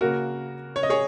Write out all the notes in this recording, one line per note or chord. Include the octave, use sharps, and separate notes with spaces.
C#3 A#3 F#4 A#4
C#5
D#5
G#4 C#5